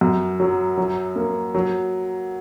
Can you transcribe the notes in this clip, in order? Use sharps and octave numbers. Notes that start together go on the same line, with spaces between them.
F#2
F#3
F#3
A#3
F#3